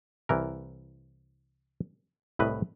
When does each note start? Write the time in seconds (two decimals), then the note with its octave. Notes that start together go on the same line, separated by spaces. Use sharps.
0.29 C2 E3 A#4
2.39 C2 A2 B4 D#5